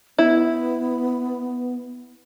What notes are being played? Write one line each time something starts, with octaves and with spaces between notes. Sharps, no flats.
B3 E4